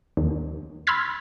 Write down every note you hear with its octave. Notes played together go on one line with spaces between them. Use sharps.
D#2
B5 C6 E6 F6 G#6 B6